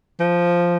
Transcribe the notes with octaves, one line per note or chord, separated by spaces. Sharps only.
F3